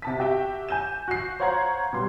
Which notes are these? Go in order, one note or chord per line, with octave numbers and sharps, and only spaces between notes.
C3 A5 B6
F#4 G4 E5 G5
G#5 G6 E7
F#4 C7
C5 C#5 F5 F#5 A#5 G#6
B2 G3 C6